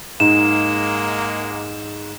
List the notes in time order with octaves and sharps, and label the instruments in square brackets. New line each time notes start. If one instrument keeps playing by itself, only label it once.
[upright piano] G#2 [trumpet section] G#3 A#3 [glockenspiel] E7